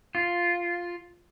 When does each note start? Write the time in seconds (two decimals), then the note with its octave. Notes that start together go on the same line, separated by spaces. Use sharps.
0.15 F4